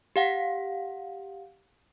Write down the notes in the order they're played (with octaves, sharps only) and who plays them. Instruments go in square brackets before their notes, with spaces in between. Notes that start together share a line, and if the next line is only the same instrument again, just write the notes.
[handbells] G4 F5 F#5